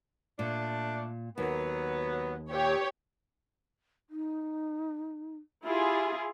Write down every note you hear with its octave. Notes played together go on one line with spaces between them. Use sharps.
A#2 A3 D4
D#2 F#3 B3
A#2 G4 C#5
D#4
E4 F4 G4 G#4